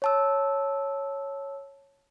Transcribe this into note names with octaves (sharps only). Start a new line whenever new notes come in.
C#5 A5 E6